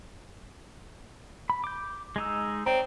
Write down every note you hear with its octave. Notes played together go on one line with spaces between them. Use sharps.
B5
D6 G6
G#3 D#4 E6
C4 C#5 D5 A#5